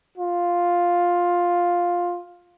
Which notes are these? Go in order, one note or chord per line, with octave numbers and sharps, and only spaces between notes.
F4